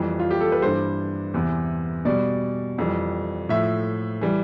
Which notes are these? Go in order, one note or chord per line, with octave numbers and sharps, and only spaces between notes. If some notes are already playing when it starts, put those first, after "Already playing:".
Already playing: F2 E3 G3
F4
G4
A4
B4
G2 E3 G3 C5
E2 C3 E3
B2 G3 D5
F2 E3 G3
A2 F3 E5
E3 G3